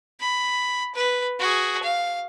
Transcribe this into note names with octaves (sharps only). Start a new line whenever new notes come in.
B5
B4
F#4 G#4
F5